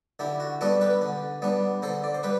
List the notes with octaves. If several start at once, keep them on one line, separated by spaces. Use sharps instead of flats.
D3 E4 G4
F#4
G3 B3 D4 F#4 A4
G4 B4
D3
G3 B3 D4
D3 A4 C5
D5
C5
G3 G4 B4